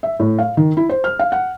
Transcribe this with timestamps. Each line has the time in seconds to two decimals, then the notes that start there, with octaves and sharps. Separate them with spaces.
0.03 E5
0.20 A2
0.39 F5
0.57 D#3
0.77 E4
0.89 C5
1.04 F6
1.19 F5
1.32 F#5